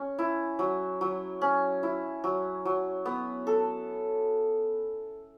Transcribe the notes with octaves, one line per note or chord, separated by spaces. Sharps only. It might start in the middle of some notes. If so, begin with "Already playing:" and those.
Already playing: C#4
E4
F#3
F#3
C#4
E4
F#3
F#3
B3
A4